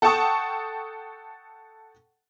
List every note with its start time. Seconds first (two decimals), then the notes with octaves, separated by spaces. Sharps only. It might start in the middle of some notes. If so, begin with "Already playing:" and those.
0.02 A4 F#5 G5 A5 C#6 D#6